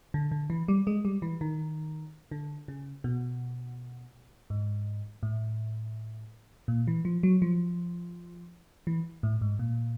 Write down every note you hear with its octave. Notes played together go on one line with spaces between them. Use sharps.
D3
D3
E3
G3
G#3
G3
E3
D#3
D3
C#3
B2
G#2
A2
A#2
E3
F3
F#3
F3
E3
A2
G#2
A#2